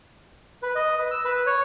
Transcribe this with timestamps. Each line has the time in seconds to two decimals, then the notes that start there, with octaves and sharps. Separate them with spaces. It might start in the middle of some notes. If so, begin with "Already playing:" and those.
0.62 B4
0.75 D#5
0.99 B4
1.11 E6
1.25 B4
1.46 C#5